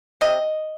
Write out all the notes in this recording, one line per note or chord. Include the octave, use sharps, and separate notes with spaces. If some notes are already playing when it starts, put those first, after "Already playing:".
C3 D#5